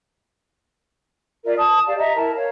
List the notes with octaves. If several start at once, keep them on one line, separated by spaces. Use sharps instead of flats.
F4 A#4 D5 E5
A5 D#6
G4 D5 F5
D#5 E5 A#5
E4 A#4 A5
A#4 C#5 F5